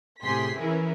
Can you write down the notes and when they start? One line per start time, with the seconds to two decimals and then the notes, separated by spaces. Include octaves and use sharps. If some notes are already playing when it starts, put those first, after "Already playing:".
0.22 A2 C3 G4 G#4 C6 B6
0.59 E3 C#4 E4 G#4 A#4 B4